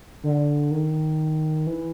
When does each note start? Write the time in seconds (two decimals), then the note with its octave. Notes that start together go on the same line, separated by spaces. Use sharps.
0.23 D3
0.71 D#3
1.67 E3